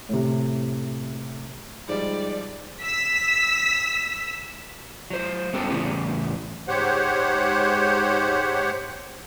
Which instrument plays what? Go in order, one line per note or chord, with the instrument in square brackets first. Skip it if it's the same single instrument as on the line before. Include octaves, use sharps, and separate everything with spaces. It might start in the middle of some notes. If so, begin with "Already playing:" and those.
[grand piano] A2 C3
[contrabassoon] G#2 [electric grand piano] F3 G3 [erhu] D5
[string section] E6 B6
[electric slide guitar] F#3 C5
G3 B3 C#4 A4 G5
E2 A2 C#3 G3 B3
[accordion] G#2 G4 C5 C#5 F#5